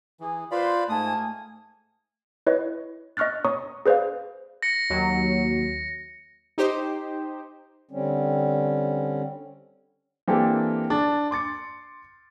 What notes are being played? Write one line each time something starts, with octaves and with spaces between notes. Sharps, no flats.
E3 G#4
F4 B4 C5 D5 F5 B5
G#2 A3 A#3 G#5 A5 D#6
E4 B4 C#5 D#5
D#5 C#6 F6 F#6 A6
C#5 A#5 C#6 D#6
G#4 B4 C5 D5 F5
A#6 C#7
D#2 F#3
D#4 G4 C5
D3 G3 C4 C#4
E3 A#3 C4 D4 G4 A4
D4
C6 D6 A6 C#7